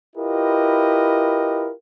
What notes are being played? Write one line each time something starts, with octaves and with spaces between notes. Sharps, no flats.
E4 F4 G4 A#4 B4 D#5